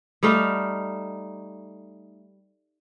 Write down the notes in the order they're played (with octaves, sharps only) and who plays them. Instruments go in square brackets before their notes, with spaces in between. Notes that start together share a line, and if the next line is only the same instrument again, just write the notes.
[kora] G3 A3 D#4 F5